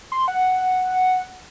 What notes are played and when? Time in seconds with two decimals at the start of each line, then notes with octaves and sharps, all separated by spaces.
0.12 C6
0.28 F#5